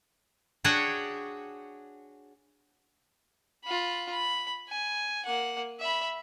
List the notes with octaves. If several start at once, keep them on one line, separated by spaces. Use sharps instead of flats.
D4 F#4 G#4 C#5 F#5 G5
F4 B5
B5
G#5
A#3 F#5
E5 B5